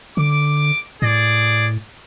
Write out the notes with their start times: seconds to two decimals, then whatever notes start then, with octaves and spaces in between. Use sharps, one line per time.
0.17 D3 D6
1.02 A2 G#4 D5